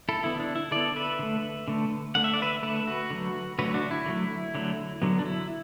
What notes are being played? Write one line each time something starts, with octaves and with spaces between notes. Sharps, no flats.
E4 A4
D3 B3 E4
D4
E4
D3 B3 A4 D5
B4 E5
D3 A3
D3 A3
D3 A3 F#5
E5
D5
B4 E5
D3 A3 B4 E5
F#4 B4
D3 F#3 A3
D3 F#3 A3 F#4 B4
D4 F#4
E4
D3 F#3 A3
D3 F#3 A3
D3 F#3 B3
D4
E4